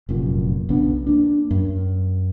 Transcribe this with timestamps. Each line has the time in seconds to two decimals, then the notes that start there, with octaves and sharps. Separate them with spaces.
0.09 F1 F#2 A#2
0.69 B1 C#3 B3 D4
1.07 A#3 D4
1.51 F#2